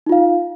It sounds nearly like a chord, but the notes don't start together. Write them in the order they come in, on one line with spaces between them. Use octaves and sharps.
D#4 F4 F5